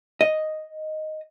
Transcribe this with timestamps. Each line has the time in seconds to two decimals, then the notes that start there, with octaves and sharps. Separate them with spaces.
0.21 D#5